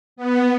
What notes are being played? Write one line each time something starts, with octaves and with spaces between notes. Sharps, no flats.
B3